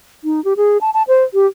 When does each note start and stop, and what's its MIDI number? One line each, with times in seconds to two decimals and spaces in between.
0.24 0.43 63
0.45 0.54 67
0.57 0.78 68
0.81 0.90 81
0.94 1.03 81
1.08 1.24 72
1.34 1.46 67